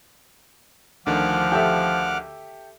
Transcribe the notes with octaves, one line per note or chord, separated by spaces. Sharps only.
D2 D3 D#3 F3 F#5 D6 F6
G4 A4 E5